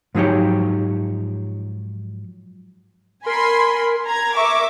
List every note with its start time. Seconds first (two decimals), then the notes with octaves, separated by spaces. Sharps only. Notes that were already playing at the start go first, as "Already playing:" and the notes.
0.15 G#2 F3 F#3 D#4 G4 C#5
3.26 A#4 G#5 B5 C6
4.06 A#5 G#6
4.37 A#4 E5 C#6 D6